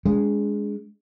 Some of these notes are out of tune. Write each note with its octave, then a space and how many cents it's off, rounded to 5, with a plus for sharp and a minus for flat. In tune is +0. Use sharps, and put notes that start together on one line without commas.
G#3 +0 D4 -35